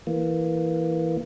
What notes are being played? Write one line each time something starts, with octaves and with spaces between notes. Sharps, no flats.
E3 A#3